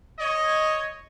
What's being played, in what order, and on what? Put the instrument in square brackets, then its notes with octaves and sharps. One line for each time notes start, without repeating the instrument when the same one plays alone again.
[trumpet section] C#5 D#5